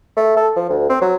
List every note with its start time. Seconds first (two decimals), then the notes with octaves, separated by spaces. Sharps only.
0.17 A3
0.37 A4
0.56 F3
0.69 D2
0.89 C4
1.01 F#3